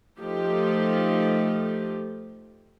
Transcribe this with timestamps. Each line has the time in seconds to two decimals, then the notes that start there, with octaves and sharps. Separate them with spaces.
0.20 F3 A3 D#4 F4 G4